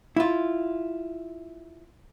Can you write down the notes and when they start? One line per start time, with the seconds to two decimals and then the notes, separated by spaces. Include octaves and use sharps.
0.16 E4 F4